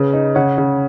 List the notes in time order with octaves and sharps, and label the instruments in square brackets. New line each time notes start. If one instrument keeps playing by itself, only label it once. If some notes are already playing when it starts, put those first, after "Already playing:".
Already playing: [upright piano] C#3 [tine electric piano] G#4 B4 C#5
[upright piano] D#4
[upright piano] C#3 [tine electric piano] C#5 F#5
[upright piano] C#3